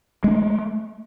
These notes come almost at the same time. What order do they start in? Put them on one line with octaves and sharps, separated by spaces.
G#3 C#4 A3